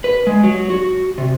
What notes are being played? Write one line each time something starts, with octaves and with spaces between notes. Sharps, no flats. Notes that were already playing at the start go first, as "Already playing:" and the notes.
B4
G#3
F#3
F#4
C3